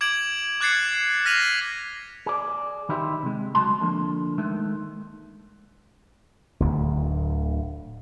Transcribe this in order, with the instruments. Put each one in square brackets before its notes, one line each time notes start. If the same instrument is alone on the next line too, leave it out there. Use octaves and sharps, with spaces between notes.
[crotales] D6 G#6 D7 F#7
D6 F#6 G#6 A6 C7 C#7
F6 A#6 B6 D#7 F7 F#7
[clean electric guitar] G#4 D5
D#3 D#4 E4 G4 C5
C3 G#3
C#2 F#3 G#3 A5 C6
D3 F3 A#3
D#3 E3 G#3 A3
[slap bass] D1 D2